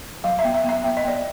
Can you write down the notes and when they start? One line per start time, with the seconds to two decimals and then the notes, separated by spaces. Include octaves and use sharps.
0.24 F#3 F5
0.39 E5
0.44 B3
0.54 E5
0.64 B3
0.69 E5
0.84 B3 E5
0.97 D#5
1.04 B3 D5